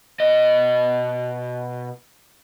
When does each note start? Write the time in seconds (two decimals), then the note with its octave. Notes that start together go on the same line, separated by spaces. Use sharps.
0.20 B2 D#5